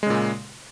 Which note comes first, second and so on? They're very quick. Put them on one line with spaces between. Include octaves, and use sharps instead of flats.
G#3 C#3 A#2